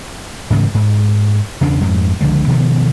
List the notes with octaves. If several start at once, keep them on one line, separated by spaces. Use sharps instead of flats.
G#2 C#3 E3 A3
G#2
E2 C#3 D4
F2 G#2
C#2 D3 F3 G#3
B2 D#3 F3 B3